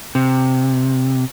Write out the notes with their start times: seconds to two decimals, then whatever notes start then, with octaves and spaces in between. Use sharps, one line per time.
0.15 C3